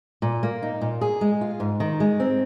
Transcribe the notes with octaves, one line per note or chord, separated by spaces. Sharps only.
A#2
A#3
D#4
A#2
G#4
G#3
F4
G#2
D#3
G#3
C4